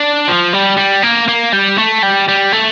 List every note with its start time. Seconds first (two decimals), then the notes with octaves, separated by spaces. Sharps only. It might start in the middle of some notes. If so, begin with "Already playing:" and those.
Already playing: D4
0.29 F3
0.54 G3
0.78 G3
1.03 A#3
1.29 A#3
1.53 G3
1.78 A3
2.03 G3
2.28 G3
2.52 A3